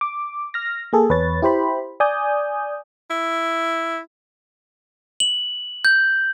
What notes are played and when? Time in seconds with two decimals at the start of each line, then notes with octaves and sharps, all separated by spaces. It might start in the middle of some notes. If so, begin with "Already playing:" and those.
0.01 D6
0.54 F6 A#6
0.93 A#3 G#4 A4
1.09 E2 B4 C#5 A6
1.42 E4 G4 C5 B5
2.00 D5 G#5 D#6 G6
3.11 E4
5.20 F#7
5.85 G6